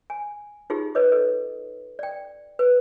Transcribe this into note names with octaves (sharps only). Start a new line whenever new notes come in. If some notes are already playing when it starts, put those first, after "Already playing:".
G#5
D#4 F4 G4 G#4
B4 C#5 D#5 D6
A4 B4 D#5
D5 G5
B4